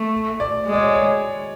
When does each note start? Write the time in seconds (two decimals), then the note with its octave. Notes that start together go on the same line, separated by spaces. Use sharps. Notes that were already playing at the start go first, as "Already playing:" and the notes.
Already playing: A3
0.40 D5
0.67 G#3
0.73 D5
0.80 C#5
0.94 C#5